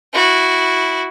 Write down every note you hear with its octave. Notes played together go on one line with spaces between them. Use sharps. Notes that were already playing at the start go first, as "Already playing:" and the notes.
E4 F#4